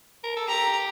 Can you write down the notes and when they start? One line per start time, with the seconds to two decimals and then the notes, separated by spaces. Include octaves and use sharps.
0.24 A#4
0.36 A4
0.48 G4 A#5